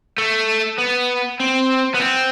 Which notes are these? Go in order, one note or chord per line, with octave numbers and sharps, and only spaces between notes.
A3
B3
C4
B3
C4